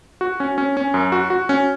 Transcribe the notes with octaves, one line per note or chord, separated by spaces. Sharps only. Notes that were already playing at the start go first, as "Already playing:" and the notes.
F#4
C#4
C#4
C#4
F#2
F#4
F#4
C#4